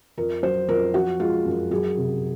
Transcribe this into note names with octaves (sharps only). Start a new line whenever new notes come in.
F2 A#4
F#3 C5
F2 A#4
F3 F#4
G#3 F4
F#2
F#3 G#4
C3